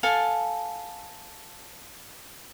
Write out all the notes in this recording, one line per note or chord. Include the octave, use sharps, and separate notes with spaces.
A4 F5 G#5 A5